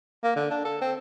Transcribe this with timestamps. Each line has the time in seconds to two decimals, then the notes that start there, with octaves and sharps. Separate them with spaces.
0.23 A#3
0.36 D3
0.50 D4
0.65 A4
0.81 C4